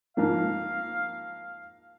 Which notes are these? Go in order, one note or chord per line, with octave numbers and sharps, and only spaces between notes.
G#2 F3 A#3 F5